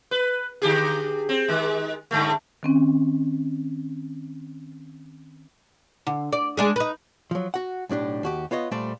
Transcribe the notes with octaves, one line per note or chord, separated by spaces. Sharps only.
B4
D3 G4 G#4
C4
D#3 G#3
G2 D3 A3
D#3 C4 C#4
D3
D5
G#3 D4 G#4
D#4 B4
F3 F#3
F#4 F#5
B1 A2 D4 G4
D#2 F#4 G4
B3 F4 C#5 D#5
A#2 G3 A3 C5 D5